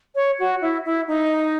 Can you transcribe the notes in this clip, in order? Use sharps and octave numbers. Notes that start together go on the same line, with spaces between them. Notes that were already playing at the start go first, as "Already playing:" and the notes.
C#5
F#4
E4
E4
D#4